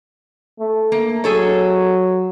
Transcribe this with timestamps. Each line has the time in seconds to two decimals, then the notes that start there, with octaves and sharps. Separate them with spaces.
0.60 A3
0.92 A#3
1.24 F#3 G#4 A4 C#5